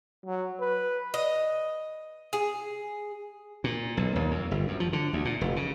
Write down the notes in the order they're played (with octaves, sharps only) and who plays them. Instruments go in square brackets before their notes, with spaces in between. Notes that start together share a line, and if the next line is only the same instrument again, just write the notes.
[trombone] F#3
B4
[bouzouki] D#5
G#4
[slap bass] A#2
B1
D#2
F2
G1
F#2
F3
D3
D2
A#2
F1
C#3